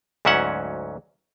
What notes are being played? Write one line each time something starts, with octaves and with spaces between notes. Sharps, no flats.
D2 G#2 F#3 C#4 E5 F#5